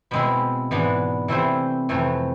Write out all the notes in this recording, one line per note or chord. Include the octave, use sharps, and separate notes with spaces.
B2 G#3 C4 E4 B5
G#2 E3 B3 D4
C3 E3 A3 C4 E4 C5
F2 C3 E3 A3